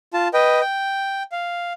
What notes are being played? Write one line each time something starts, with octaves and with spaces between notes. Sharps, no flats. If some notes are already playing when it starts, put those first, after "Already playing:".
F4 A5
B4 D#5 G5
G5
F5